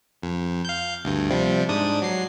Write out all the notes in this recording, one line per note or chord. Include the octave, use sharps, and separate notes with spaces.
F2
F5 G6
D2 G2
C3 F3 G3
G#2 D4 D#6
F#3 C7